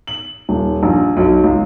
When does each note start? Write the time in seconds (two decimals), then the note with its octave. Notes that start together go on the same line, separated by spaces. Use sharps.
0.07 F#7
0.49 D#1
0.83 A#1
1.17 B1
1.44 C#2